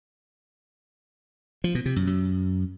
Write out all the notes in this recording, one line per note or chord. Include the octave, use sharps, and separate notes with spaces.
F3
B2
C3
F#2
F#2